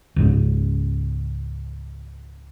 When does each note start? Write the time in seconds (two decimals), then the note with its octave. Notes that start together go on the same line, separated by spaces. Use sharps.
0.16 C#2 G#2